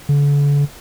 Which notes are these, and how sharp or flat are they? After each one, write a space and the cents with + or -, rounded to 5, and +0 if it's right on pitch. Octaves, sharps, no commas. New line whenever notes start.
D3 -40